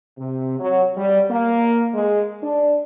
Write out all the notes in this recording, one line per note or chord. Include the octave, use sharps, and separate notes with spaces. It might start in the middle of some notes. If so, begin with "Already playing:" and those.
C3
F#3
G3
A#3
G#3
D4